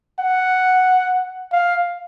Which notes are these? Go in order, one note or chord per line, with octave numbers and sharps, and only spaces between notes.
F#5
F5